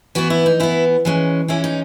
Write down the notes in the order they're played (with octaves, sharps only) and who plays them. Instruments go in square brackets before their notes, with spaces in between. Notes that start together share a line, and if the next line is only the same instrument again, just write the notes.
[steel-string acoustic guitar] E3 B3 F#4
E4
D#4
E3 B3 E4
E3 G#3 C#4
E3 G#3 C#4 E4
D#4